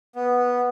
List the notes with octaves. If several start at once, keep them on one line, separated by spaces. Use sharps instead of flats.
B3